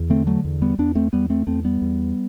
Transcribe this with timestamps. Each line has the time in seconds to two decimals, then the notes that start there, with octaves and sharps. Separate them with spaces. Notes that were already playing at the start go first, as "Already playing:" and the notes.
Already playing: E2
0.10 D3 A3 C4
0.27 F#3 A3
0.44 E2
0.62 G3 B3
0.78 E2 B3 D4
0.95 A3 C4
1.13 E2 G3 B3
1.30 A3 C4
1.47 E2 A3 C4
1.64 G3 B3
1.82 E2